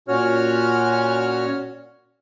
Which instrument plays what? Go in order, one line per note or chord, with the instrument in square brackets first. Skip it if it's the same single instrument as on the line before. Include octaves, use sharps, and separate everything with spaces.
[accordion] A#2 C#4 F#4 C#5 F6